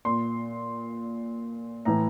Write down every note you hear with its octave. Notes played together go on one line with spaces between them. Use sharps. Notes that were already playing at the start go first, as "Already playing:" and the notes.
A#2 C6
A2 E3 A#5